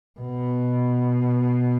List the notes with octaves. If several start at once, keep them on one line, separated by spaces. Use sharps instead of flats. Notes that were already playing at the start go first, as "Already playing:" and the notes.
B2